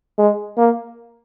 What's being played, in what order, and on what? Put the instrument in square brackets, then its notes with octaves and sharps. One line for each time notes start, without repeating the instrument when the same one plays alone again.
[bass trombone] G#3
A#3